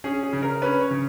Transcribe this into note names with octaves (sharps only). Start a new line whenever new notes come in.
C#4 G#4
G#4
C#3
A#4
C#4 B4
C#5
C#3